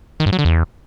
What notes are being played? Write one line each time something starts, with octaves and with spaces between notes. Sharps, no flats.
D#3
G2
F#3
D3
E2